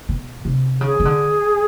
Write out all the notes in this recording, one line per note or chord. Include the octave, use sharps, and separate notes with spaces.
B2
C3
C#3 G#4
C#3
D3